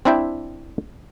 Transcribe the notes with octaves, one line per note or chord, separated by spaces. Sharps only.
C4 D4 E4 E5 G5